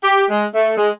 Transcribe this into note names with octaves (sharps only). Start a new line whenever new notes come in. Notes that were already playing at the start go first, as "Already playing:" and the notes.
G4
G#3
A3
G#3